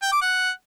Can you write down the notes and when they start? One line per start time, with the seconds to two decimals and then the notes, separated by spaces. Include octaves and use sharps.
0.02 G5
0.12 D6
0.21 F#5